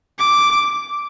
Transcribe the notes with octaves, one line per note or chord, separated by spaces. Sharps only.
D6